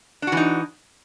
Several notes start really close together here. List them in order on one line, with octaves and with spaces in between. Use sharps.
D4 F#4 E3 D#4